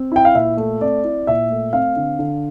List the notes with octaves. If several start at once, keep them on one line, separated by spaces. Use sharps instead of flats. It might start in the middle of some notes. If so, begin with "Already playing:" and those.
Already playing: C4
E4 G5
F5
A#2 E5
A3
C4 D5
E4
A#2 E5
A3
C4 F5
D3
D3